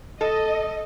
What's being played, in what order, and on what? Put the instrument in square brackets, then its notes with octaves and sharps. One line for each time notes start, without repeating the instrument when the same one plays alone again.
[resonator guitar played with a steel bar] A4 [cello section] D#5